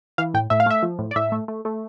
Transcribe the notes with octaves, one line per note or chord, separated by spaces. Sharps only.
E3 F5
A2 G5
A2 E5
F5
A3 E5
F3
A2
D5
A2 E5
A3
A3
A3